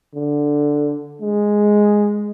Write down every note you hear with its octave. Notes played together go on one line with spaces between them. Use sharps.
D3
G#3